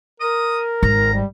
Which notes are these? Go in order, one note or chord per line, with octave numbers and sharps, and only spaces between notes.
A#4 D#6
G#1 A#5
G3